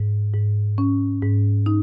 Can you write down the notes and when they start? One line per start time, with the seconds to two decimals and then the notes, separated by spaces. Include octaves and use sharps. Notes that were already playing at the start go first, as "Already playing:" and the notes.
Already playing: G#2
0.34 G#2
0.78 C#4
1.22 G#2
1.66 D#4